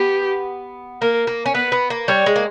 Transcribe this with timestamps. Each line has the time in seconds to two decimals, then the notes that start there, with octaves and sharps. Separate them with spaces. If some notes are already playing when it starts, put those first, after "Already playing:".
Already playing: B3 G4
1.01 A#3 A#4
1.27 A#3
1.46 C#4
1.54 B3 B4
1.72 B3
1.90 A#3
2.08 G3 C#5
2.26 G#3
2.36 A#3